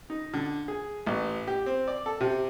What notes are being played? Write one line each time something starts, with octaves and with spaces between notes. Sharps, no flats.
D#4
D3
G#4
A1
G4
C4
D5
A4
C3